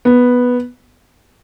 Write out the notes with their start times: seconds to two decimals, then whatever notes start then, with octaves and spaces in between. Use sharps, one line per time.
0.05 B3